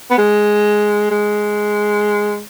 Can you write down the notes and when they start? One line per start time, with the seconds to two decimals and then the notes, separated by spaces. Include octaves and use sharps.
0.11 B3
0.18 G#3
1.11 G#3